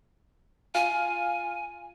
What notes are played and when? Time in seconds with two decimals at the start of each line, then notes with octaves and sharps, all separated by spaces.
0.75 F4 G#5